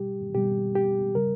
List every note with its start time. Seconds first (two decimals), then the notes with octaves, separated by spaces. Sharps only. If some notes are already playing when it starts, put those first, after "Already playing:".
Already playing: B2 G3 G4
0.35 B2 G3 G4
0.75 G4
1.15 C#3 G3 A#4